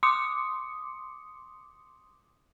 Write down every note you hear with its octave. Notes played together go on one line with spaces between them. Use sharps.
C6 D6 D#6 C#7